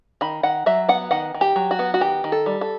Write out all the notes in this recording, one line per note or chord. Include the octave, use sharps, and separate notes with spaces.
D#3 B5
D#3 F#5
F#3 E5
B3 F#5
D#3 F#5
D#3
G4
F#3
F#4
B3
F#4
D#3 G4
D#3
A4
G3
A4